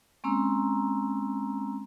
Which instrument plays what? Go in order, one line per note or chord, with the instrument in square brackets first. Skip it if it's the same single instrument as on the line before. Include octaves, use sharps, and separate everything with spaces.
[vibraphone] G#3 A#3 C4 C#4 A#5 E6